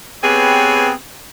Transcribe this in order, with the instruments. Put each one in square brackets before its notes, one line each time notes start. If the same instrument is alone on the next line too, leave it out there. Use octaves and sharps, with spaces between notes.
[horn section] B3 C4 G4 G#4 B4 C#5